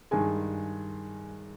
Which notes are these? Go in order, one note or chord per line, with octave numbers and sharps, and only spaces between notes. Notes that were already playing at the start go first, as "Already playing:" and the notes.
G2 D#3 G#3 G#5